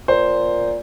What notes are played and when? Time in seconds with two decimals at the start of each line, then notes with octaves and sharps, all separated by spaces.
0.08 A#2 C5